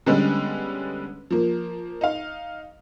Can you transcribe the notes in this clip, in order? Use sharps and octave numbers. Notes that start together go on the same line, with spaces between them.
D3 G3 G#3 B3 C#4
F3 A#3
D#4 F5